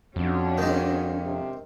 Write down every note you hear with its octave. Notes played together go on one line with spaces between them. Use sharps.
F2 C#4 D4 F#4
D#3 G#3
C3